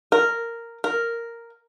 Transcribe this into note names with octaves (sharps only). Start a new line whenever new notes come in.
A#4
A#4